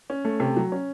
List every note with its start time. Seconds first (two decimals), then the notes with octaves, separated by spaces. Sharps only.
0.10 C#4
0.25 A3
0.40 C3
0.56 F#3
0.72 C#4